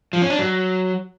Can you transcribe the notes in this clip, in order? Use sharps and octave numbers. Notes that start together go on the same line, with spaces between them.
F3
C#4
D4
F#3